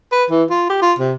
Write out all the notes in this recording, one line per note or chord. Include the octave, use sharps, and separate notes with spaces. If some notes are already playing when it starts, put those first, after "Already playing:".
B4
E3
F4
G4
F4
C3